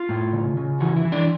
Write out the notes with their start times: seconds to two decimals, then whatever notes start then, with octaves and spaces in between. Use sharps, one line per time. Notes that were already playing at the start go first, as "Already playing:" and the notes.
Already playing: F4
0.09 A2
0.33 C#3
0.57 C#3
0.80 E3 F#4
0.96 E4
1.05 E3
1.12 D4